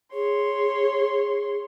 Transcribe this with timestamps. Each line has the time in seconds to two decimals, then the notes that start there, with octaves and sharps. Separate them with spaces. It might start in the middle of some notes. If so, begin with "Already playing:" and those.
0.13 G#4 C#5 C6